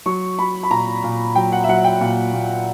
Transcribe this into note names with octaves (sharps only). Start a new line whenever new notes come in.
F#3 C#6
F#3 B5
B5
A#2 A#5
A#2
F#3 G5
F#5
E5
F#3 F#5
G5
A#2
A#2